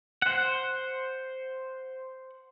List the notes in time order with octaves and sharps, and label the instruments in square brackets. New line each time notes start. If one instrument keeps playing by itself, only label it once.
[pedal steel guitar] C5 F#5